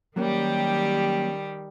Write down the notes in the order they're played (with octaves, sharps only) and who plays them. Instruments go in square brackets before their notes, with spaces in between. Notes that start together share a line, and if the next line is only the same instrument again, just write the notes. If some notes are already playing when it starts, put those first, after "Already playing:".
[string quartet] D#3 G3 G4 [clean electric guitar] F#3 A#3 C#4